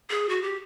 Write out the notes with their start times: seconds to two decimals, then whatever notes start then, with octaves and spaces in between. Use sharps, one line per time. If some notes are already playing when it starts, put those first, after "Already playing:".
0.10 G#4
0.29 F#4
0.42 G4